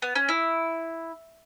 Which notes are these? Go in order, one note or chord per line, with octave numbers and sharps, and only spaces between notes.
B3
C#4
E4